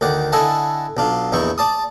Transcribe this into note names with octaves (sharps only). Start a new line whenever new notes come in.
D2 D#3 D5 F#5
D3 E4 D#5 F#5 G#5 A5
B1 D4 F4
A#1 E2 D#4 E4 C#6
D5 A5 D#6